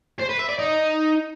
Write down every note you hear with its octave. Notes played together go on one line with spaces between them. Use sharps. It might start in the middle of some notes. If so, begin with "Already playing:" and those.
C5
B4
E5
D5
D#4